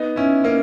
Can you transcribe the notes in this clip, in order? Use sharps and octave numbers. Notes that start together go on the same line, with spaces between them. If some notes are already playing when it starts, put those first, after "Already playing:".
Already playing: B3 D#4
C#4 E4
A#3 C#4